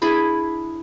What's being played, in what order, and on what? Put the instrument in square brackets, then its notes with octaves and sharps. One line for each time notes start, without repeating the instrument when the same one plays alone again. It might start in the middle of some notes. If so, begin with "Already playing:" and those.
[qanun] D4 E4 G#4 B5